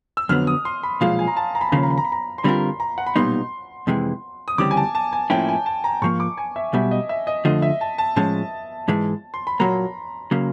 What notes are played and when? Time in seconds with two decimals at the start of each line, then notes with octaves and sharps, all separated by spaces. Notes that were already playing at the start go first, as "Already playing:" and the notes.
0.17 E6
0.29 F2 D3 F#3 B3 F6
0.47 D#6
0.65 C6
0.83 B5
1.01 B1 A#2 F3 G#3 F5
1.19 G#5
1.28 A#5
1.37 A5
1.55 A#5
1.61 B5
1.69 A#5
1.72 D#2 C#3 F3 A#3 B5
1.83 A#5
1.91 B5
1.98 A#5
2.05 B5
2.12 A#5
2.38 C6
2.44 D3 G3 C4 F4 A#4 B5
2.80 A#5
2.98 F#5
3.06 B5
3.16 B1 A#2 G3 B3 D#4 C6
3.87 F2 C3 E3 G#3
4.48 D#6
4.58 D2 C#3 E3 G3 C4 D6
4.71 G#5
4.77 A5
4.95 A5
5.13 G#5
5.30 A2 F3 A#3 C#4 E4 G5
5.49 G#5
5.66 A5
5.84 A#5
6.02 G#2 F3 A#3 C#6
6.20 D6
6.38 G#5
6.56 E5
6.73 B1 B2 G3 E5
6.91 D#5
7.09 E5
7.27 D#5
7.45 F2 D3 F3 A3 D#5
7.62 E5
7.81 A5
7.98 A5
8.16 A2 F3 G#3 C#4 A5
8.88 G#2 E3 G#3
9.34 C6
9.47 B5
9.59 A#2 F#3 A#3 A#5
10.31 C#3 F#3 A#3